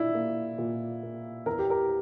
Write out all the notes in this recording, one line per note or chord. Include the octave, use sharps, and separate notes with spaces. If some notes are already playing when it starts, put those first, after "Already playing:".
Already playing: A#2 D4 E4
A#3
A#2
A#3
E2 A#4
G4
A#4